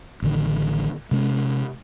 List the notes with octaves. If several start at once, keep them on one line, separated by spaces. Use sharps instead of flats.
A1 D3 D#3
C3 G#3 C#4